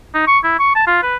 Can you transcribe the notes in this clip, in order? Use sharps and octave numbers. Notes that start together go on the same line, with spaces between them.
D#4
C#6
E4
C#6
A5
F4
B4